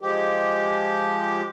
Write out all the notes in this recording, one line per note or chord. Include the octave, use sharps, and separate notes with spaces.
F3 G#3 G4